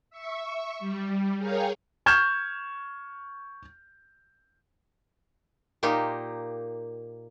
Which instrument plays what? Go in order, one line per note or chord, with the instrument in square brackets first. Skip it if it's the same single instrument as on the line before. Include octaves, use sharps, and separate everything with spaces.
[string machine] E5 C#6
G3
G#4 A#4 C#5 F5 G5
[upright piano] C#6 F6 G6 G#6 E7
[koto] A#2 A#3 D#4 G4